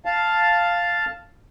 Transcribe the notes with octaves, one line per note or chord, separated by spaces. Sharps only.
F5 A5